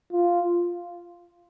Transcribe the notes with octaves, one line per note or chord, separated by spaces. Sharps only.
F4